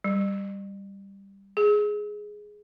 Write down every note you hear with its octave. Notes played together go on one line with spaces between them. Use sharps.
G3
G#4